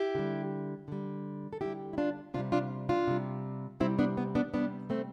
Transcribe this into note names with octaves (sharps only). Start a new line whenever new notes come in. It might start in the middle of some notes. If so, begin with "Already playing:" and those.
Already playing: E4 G4
D3 G3
D3 G3
A4
D3 G3 E4 G4
E4
D4 F4
C3 G3 D4 F4
D4 F4
D4 F4
C3 G3
C3 G3 C4 E4
B3 D4
B3
B3 D4
C3 G3 B3 D4
A3 C4